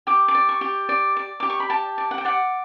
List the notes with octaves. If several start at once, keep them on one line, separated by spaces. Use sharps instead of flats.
G4 D6
D6
D5
C#6
G4
D5
D5
G4 D6
C#6
B5
G4 A5
D5
F#5
G5
D5 F#5